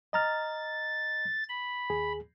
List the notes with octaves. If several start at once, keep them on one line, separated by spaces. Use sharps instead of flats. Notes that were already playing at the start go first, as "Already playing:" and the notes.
D#5 A#5 F6 A6
B5
D#2 G#4